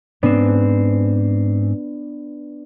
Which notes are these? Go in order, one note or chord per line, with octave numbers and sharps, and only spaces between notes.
G#2 B3 C4 D4